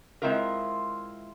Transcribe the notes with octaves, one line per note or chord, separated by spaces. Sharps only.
G#3 C4 E4 F4 A#4